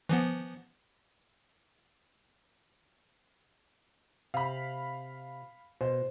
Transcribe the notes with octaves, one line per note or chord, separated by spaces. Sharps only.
E3 F3 B3
C3 F5 B5
B2 C5